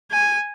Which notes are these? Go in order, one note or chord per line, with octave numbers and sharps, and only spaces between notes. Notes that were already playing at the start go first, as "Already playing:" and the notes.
G#5